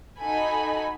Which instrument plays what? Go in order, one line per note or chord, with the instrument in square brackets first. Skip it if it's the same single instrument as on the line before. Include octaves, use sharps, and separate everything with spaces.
[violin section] D#4 F#4 A4 G#5 B5